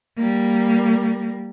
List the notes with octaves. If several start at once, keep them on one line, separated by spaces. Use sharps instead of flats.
G3 A#3